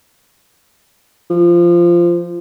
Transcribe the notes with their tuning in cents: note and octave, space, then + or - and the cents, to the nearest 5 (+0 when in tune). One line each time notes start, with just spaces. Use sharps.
F3 -15